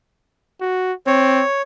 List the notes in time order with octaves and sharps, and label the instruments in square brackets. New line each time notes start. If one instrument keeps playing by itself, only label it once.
[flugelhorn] F#4
[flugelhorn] C4 [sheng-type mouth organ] C#5